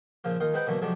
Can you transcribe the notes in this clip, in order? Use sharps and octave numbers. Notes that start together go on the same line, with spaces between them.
A#2 C#3 F3 F4
D#2 D#4 F4 A#4 C6
G#3 C4 D#4 B4 F#5 G5
B2 D3 E3 F#3 A3 A#3
F2 C3 F#3 G#3 A3 D4